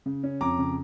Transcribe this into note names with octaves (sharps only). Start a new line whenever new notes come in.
C#3
C#4
F2 A#5 D6
C#3